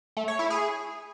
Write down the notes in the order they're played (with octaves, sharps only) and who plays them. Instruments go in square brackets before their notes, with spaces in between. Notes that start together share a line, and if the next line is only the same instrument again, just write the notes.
[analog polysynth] A3
C#5
E4
G#4